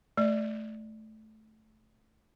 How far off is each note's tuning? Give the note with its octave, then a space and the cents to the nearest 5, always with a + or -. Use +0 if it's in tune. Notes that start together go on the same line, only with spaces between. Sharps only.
A3 -15 D5 +0